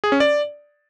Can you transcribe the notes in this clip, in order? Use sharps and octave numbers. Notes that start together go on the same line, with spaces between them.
G#4
C#4
D5